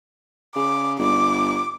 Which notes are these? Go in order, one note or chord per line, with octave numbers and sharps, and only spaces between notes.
C#3 D6
G1 D6